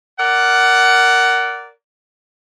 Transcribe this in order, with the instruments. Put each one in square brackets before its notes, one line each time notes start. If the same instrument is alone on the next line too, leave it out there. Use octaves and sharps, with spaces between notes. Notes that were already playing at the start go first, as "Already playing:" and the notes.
[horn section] A#4 D5 F#5